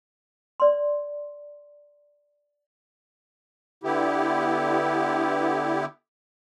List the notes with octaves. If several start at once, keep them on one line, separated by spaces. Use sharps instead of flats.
D5 C6
D3 B3 E4 G4